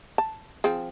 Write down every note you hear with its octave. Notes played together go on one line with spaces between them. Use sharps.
A5
F3 C4 G#4